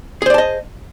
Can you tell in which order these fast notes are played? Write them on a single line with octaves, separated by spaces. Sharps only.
G#4 C5 D5 A5 D#5